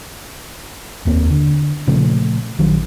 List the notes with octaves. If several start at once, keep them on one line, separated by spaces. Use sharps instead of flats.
F1 D#2 A#3 C4
D3
A#2 C#3 F3 A3
A#1 D#3 F#3